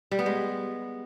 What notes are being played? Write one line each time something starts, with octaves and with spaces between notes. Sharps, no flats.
G3
B3
G#3